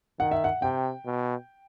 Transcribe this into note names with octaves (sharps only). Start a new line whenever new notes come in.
D#3 F#5
E5
F#5
C3 G5
B2